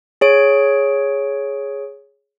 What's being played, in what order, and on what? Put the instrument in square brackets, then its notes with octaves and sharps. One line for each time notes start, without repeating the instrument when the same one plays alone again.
[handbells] G#4 C#5 D7